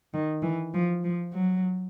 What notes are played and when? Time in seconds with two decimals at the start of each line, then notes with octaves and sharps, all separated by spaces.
0.13 D#3
0.43 E3
0.74 F3
1.03 F3
1.34 F#3